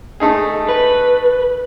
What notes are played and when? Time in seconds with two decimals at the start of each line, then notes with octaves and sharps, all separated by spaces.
0.20 A3 D#4 G#4
0.69 B4